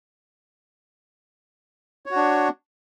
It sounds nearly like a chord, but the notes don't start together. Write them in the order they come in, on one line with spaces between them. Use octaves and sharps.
C#5 F#4 D4